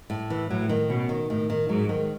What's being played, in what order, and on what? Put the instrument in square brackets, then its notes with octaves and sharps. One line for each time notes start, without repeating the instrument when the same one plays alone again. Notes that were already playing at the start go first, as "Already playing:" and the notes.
[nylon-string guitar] A2
E3
[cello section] A2 [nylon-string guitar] F#3
[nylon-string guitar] D#3
[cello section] B2 [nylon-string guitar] C#4
[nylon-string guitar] D#3
[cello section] A2 [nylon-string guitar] D#3
[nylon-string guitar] D#3
[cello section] G#2 [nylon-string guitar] F#3
[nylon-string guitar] D#3